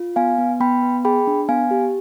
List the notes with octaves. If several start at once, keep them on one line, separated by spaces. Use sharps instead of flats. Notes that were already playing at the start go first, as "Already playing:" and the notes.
Already playing: F4
B3 F5 G#5
B3
B3 G5 B5
B3
G#4 G5 B5
D4
B3 F5 G#5
G4